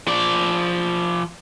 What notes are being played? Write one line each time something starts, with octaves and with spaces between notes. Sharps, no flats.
F3 D5